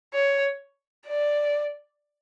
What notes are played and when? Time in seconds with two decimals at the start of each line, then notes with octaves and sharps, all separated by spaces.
0.14 C#5
1.07 D5